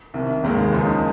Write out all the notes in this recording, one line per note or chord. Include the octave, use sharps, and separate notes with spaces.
C2 C3 D#3
F1 D#2 D#3 G#3
C#2 C#3 F3 A#3 D#4